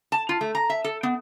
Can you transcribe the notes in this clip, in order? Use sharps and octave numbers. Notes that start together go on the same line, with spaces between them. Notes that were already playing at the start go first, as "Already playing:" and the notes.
A5
F4
A3
A#5
E5
A4
B3